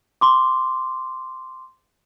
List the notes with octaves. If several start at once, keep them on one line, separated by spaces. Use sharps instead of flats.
C6 D6